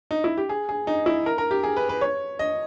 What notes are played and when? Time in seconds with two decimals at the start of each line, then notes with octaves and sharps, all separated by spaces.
0.11 D#4
0.24 E4
0.37 G4
0.49 G#4
0.69 G#4
0.87 D#4
1.06 E4
1.26 A#4
1.38 A#4
1.51 G4
1.63 G#4
1.77 B4
1.89 B4
2.01 C#5
2.39 D#5